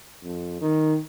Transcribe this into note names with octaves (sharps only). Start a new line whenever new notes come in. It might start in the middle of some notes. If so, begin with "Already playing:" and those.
F2
D#3